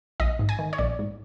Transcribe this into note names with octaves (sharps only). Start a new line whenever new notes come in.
A#1 D#5
G#2
G#5
D#3
C#5
A#1 D5
G#2